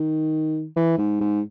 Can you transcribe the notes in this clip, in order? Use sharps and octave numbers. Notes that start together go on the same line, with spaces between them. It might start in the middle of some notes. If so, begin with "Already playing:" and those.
Already playing: D#3
E3
G#2
G#2